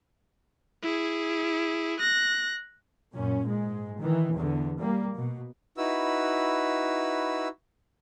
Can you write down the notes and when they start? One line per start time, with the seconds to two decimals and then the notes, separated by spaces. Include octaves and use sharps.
0.82 E4 G#4
2.00 F#6 A#6
3.13 F#2 A#2 C#4
3.44 G#2 G#3
4.00 D#3 E3
4.36 E2 D3
4.78 G3 A#3
5.15 B2
5.77 D#4 E4 F#4 B4 E6